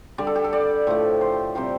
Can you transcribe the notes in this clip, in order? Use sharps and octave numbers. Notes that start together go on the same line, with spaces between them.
D3 G3 D5
A4
G4
A4
D5
A2 F3 A3
C5
C3 G3 C5